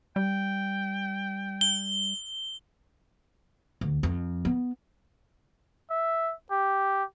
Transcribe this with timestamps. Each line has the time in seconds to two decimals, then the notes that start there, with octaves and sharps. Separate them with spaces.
0.16 G3 G5
1.61 G7
3.81 D2
4.03 F2
4.45 B3
5.91 E5
6.51 G4